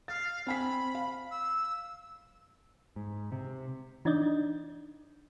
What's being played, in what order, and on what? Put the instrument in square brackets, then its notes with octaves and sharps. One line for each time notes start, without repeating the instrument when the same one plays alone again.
[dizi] F5 [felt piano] A6
[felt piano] C4 G#5 B6 [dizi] B5
[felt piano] F5
[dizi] E6
[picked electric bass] G#2
C3
[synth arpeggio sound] E3 D4 D#4 D5 D#5 G6